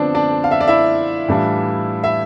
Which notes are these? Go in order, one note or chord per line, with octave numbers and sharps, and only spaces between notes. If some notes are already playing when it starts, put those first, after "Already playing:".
Already playing: D3 F3 B3 C4 D4 C5 D5
D4 D5
F5
E5
D5
E4 E5
A2 E3 G3 D4 F4
E5